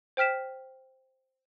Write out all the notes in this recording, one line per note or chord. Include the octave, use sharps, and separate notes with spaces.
C5 G5 F6 B6 E7